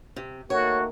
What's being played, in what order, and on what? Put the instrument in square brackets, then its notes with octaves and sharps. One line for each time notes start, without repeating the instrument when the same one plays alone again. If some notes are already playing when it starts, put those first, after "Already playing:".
[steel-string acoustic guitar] C3
[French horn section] D#3 A3 A#3 [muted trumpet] F#4 [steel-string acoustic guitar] C#5